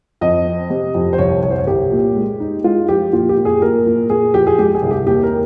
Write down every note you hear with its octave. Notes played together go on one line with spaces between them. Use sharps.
F2 D#5
C4
C3
F2
C5
C2 C#5
C2 C#5
C5
C#5
C2 G4
A#2
G#3
D#4
G#3 F4
F3 G4
A#2 F4
G4
A#2
G#4
A#2 A#4
A#2
A#2 G#4
F3 G4
G#4
G#3 G4
G#4
C2
G4
D#2 G4
A#4